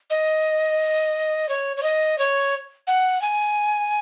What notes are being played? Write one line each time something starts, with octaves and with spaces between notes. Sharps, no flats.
D#5
C#5
C#5
D#5
C#5
F#5
G#5